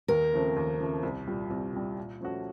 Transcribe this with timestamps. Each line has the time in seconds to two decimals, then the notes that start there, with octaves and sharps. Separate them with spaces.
0.08 D#2 A#4
0.32 C#3 F3 A3 C4
0.56 D#2
0.79 C#3 F3 A3 C4
1.03 C2
1.27 A#2 G3
1.50 C2
1.73 A#2 G3
1.97 A#2
2.21 F3 A3 C#4 F#4